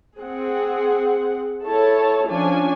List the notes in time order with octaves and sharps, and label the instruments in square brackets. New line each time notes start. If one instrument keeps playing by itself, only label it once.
[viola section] C4 G#4 F#5
E4 A4 C#5 A5
F3 C#4 D4 G#5